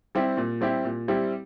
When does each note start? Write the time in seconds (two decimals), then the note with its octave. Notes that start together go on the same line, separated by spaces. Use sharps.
0.15 G3 C4 E4 G4
0.37 A#2
0.61 G3 C4 E4 G4
0.85 A#2
1.08 G3 C4 E4 G4